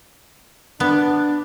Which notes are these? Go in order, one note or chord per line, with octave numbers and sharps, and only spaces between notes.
B3 D4